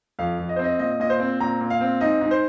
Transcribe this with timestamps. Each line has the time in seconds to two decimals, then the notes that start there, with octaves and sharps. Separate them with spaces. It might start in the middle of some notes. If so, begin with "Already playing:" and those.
0.19 F2 F5
0.39 F2
0.49 D#5
0.56 C5
0.59 C4
0.64 D#5
0.79 A#2 D#5
1.00 A#2 D#5
1.10 C5
1.20 C4
1.40 A#2 A#5
1.61 A#2
1.70 F5
1.81 C4
2.01 G#2 D#5
2.21 G#2
2.31 C5